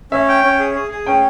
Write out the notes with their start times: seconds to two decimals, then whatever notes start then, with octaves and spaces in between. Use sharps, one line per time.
0.12 C#4 E5
0.28 G5
0.44 C#4
0.59 G#4
0.75 G#4
0.91 G#4
1.06 C#4 G5